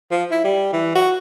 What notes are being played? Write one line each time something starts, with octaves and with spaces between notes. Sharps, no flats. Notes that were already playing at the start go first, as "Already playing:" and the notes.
F3
E4
G3
E3
F#4